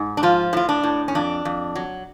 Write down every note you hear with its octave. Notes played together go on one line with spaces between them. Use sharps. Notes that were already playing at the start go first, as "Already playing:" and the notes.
Already playing: G#2
D4
F3 F4
A2 F4
D4
A2
C#4
F2 D4
F2
F#3